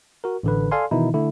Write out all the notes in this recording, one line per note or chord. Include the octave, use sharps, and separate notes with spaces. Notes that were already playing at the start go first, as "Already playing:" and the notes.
F#4 A#4
A1 D3 B4
A4 D5 F5 G#5 C6
B2 D#3 E3 D#4 E4
D3 A3 E4